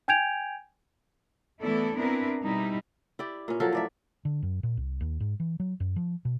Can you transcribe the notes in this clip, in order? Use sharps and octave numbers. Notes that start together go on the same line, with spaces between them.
G5 G#5 G6 G#6 D7 F7
E3 A3 B3 E4 A4 D5
B3 C4 D4 E4 A#4 B4
B2 G3 D#4 E4
E4 G4 D5
A#2 C#4
F3 F#3 A4 A#4
A2 D5 E5
D3
F#2
A#2
C2
D#2
G#2
E3
F#3
F#2
F3
B2